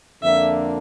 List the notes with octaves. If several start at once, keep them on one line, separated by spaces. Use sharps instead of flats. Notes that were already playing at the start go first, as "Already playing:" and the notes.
F2 D3 F3 A#3 D4 E5